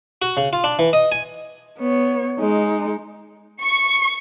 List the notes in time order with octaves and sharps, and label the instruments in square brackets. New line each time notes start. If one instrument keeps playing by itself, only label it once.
[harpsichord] F#4
C#3
F4
D4
E3
D#5
G#5
[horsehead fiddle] B3 C#5
G#3 D#4
[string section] C#6